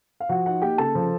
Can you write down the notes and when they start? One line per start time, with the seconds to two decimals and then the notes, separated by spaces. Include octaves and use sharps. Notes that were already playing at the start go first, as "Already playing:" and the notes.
0.20 F5
0.29 F3 F#4 F#5
0.46 D#4 F#4 F#5
0.62 A#3 G4 G5
0.78 C#3 A4 A5
0.95 F3